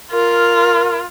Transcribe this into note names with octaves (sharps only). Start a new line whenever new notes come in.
F4 A#4